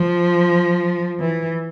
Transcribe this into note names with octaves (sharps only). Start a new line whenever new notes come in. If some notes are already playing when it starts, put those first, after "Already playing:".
Already playing: F3
E3